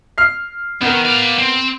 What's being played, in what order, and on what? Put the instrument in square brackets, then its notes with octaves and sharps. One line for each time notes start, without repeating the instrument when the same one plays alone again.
[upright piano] F6 C7
[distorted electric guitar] D#3 [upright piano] B3 A#4
[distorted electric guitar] D5 F5
C4